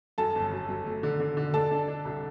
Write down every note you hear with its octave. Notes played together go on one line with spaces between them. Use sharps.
F#2 A4 A5
G1
F#2
F#2
A3
D3
D3
D3
D4 A4 A5
D4
D4
C2